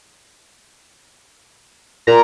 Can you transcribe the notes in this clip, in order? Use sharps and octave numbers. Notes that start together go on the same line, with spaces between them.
A#2 A#5